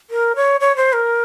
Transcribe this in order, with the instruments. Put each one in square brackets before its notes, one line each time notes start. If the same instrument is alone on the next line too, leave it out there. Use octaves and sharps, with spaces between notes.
[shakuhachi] A#4
C#5
C#5
C5
A#4